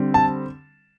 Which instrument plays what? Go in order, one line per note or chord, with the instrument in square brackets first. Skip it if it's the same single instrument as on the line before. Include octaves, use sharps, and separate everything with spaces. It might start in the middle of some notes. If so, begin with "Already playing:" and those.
Already playing: [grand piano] D3 G3 C4
A5